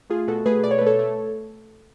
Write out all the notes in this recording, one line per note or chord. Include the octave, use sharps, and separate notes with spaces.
A3 F4 G#4
B2 F#4 A4
A3 G#4 B4
B2 D5
C#5
B4
A3
A4 C#5
A3